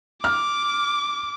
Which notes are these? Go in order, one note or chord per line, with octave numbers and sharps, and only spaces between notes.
D6 F6